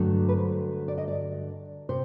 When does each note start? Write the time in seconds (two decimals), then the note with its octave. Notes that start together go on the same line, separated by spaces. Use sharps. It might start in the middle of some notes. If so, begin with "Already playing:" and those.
Already playing: G2 D3 F#3 A3
0.29 B4
0.37 C5
0.88 D5
0.98 D#5
1.08 D5
1.89 C3 C5